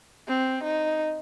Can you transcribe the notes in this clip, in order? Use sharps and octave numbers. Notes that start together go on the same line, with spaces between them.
C4
D#4